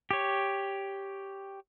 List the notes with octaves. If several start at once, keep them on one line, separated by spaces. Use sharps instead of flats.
G4 C#5